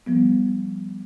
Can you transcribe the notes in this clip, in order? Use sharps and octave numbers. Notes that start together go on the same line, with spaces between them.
F3 G3 B3